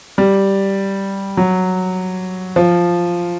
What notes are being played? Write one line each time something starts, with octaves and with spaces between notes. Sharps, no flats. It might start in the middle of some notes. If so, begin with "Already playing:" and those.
G3
F#3
F3